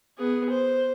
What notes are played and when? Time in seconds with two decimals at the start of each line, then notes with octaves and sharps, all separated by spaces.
0.18 B3 G#4
0.49 C5